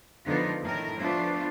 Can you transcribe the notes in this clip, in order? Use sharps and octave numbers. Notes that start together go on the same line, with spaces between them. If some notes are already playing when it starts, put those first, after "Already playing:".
D3 F3 B3 D#4 F4 A#4
A2 D#3 A#4
F3 A3 B3 D4 F4